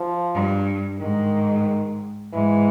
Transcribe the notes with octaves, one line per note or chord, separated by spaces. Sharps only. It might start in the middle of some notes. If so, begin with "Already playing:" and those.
Already playing: F3
G2
G#2 D#3
G#2 E3